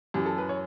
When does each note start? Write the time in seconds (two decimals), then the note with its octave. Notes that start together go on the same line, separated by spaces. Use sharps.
0.14 F#2 E3 G4
0.25 A4
0.38 B4
0.49 C#5